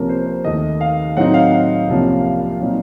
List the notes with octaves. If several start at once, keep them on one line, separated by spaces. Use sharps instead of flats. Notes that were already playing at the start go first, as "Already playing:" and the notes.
Already playing: C2 C3 F3 A#3 C#4 A#4
C5
C5
D#2 D#3 A3 D#5
F5
A2 F#3 C4 D#4 F#5
F5
F5
C2 C3 F3 A#3 C#4
F5
A#2 F#3 C4 D#4